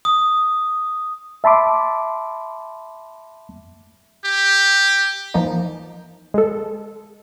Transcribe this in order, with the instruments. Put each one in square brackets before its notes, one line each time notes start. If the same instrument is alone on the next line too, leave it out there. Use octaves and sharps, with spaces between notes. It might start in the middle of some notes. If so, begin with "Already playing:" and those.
[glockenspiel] D#6
[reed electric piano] E5 A5 B5 C6 D6
[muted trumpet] G4
[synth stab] E3 F3 A#3 D#4
G#3 A4